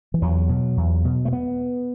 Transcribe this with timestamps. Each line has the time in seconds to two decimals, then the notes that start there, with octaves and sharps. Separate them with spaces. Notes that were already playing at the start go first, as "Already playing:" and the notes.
0.14 E3
0.22 E2 F#3
0.49 B2
0.77 E2
1.05 B2
1.25 A3
1.33 B3